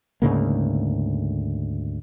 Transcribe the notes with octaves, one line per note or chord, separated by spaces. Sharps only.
D2 G#2 C#3 A#3